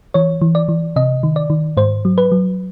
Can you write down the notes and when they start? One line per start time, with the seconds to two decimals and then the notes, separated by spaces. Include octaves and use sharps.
0.14 E3 C#5
0.41 E3
0.55 D5
0.68 E3
0.96 C3 D#5
1.23 D#3
1.36 D5
1.50 D#3
1.77 G#2 C5
2.05 F#3
2.18 B4
2.32 F#3